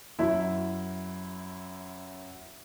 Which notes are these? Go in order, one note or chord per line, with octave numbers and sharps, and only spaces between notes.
F#2 E4